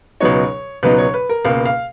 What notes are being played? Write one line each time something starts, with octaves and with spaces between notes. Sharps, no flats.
C#2 B2 F#3 B3 D#4 C#5
C#2 B2 F#3 B3 D#4 B4
C#5
B4
A#4
C#2 B2 A#3 F5
F5